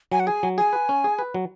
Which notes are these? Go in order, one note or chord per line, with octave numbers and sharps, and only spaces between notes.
F#3 G#5
F#5
G#4 G#5
F#3
G#4 G#5
B4
C#4
G#4
B4
F#3